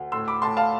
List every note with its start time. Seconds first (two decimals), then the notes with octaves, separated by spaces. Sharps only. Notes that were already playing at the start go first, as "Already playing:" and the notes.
Already playing: D2
0.12 A2 C6 E6
0.28 B5 D6
0.42 A2 A5 C6
0.57 F5 A5